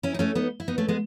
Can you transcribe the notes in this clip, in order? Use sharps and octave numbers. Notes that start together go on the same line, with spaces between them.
C#4 E4
D#4
A3 C#4
B3 D#4
E4
B3 D#4
A3 C#4
G#3 B3